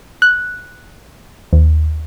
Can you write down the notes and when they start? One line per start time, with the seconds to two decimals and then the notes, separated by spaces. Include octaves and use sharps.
0.22 F#6
1.53 D#2